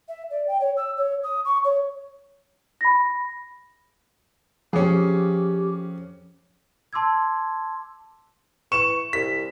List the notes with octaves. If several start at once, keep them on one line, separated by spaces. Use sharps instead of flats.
E5
D5
G5
C#5
E6
C#5
D#6
C#6
C#5
B5 A#6
F2 F3 C#4 G4 G#4
A5 C6 D6 E6 G#6
E3 C#6 E7
C2 B6